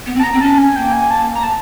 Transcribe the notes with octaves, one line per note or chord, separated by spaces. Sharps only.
B3
C4
A5
B3 A#5
C4
C#4 A5
G#5
A#3 G5
G#5
A5
A#5
A5